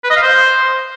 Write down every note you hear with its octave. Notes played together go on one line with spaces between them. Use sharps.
B4
D#5
F5
C5